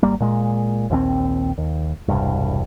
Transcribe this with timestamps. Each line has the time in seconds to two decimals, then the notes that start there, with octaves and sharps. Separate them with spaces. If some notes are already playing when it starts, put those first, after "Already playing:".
0.03 G#1 G3 A#3
0.20 A#2 G#3
0.90 A#1 D#2 C#3 C4
1.58 D#2
2.08 E1 C2 G2